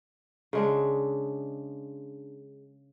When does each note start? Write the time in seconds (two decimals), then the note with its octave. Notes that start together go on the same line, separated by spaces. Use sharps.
0.53 C#3 G#3 D4